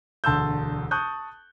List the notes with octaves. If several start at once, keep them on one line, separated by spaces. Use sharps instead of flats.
E1 D2 A5 C6 E6 G6
A5 C#6 D#6 F#6 G6